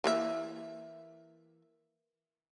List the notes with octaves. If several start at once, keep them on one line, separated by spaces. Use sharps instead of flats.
E3 A#3 E5